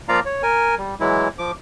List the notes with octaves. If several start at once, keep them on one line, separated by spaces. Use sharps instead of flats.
F3 A#3 F4 D5 F5 A#5
C#5
A#4 G#5
G3
E3 F#3 G#3 E4
F3 D6